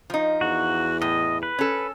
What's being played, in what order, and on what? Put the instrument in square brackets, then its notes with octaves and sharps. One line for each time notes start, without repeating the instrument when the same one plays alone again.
[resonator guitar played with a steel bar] F3 D#4
[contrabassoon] E2 [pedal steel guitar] F#4
[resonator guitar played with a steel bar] A2 [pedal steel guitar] D#5
[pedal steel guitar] B4
[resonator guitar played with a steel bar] C#4 A4